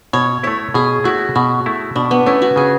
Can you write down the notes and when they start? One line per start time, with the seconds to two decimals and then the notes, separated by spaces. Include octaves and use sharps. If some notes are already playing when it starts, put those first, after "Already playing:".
0.13 B2 C#5
0.43 A3 E4 C#5
0.74 B2 G#4
1.04 A3 E4 F#4
1.35 B2 F#4
1.66 A3 E4
1.96 B2 D4
2.11 B3
2.26 A3 C#4 E4
2.42 F#4
2.56 C#3 G#4